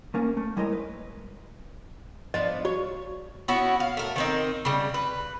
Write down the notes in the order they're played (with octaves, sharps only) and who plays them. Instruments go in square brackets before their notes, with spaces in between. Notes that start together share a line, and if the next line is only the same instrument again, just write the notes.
[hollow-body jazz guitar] A3 A#3 C#4
A3
G3 G#3 E4 A#4 C#5 D#5
B4
[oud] F3 B3 D4 [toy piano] D#5
[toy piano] F#4 [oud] C#5
[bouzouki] B3 C#4 E4 F#4
F5
A3 A#4
D#3 C4 D#4
C#3 G3
B4